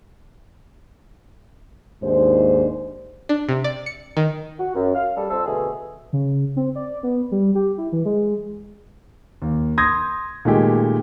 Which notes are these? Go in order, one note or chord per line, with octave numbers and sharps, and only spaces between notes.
D#2 G#2 D4 C5
D4
C3
D5
C#7
D#3
F#4
F#2
F5
G3 A4
F2 C5 A5 E6
B2 D3 A3 G#4
C#3
C4
D5
B3
G3
G4
E4
E3
G#3
D#2
C6 D#6 G6 G#6 A#6
A#2 D#3 G#3 A3 G4